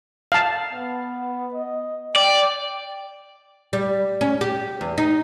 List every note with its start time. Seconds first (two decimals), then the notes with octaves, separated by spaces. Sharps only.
0.32 F5 A5
0.73 B3
1.54 D#5
2.16 D5 G5
3.73 G3
4.21 C#4
4.41 G4
4.81 E2
4.98 D#4